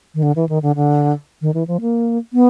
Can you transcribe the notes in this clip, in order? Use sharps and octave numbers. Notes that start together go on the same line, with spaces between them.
D#3
D3
E3
D#3
D3
D3
D#3
E3
F3
A#3
B3